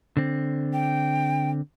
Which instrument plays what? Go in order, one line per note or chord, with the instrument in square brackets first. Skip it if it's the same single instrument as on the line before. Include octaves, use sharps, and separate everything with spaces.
[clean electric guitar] D3 C4
[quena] G5